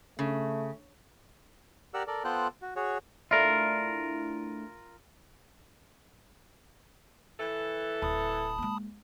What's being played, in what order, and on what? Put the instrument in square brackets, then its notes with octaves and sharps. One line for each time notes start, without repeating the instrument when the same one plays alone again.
[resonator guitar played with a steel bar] C#3 [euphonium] A3
[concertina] G4 A#4 D5 F#5 E6
A4 A#4 D5
B3 F4 A4 C5 G5 F#6
F#4
F#4 G#4 C#5
[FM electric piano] A3 D4 E4 [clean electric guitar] F4 A#4
[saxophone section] E3 A4
[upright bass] D1 [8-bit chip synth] A5 B5 D#6
[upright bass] G#3 A#3